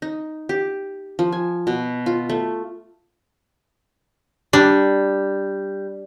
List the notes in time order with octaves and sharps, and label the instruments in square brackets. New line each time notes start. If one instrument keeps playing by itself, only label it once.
[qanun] D#4
G4
F3
G#5
B2
F4
A3
[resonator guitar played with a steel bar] G3 [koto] D4